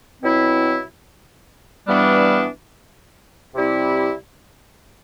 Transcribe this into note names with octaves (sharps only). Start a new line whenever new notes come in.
B2 F#3 C4 E4
G2 E3 G3 B3 D4
C3 G3 C4 E4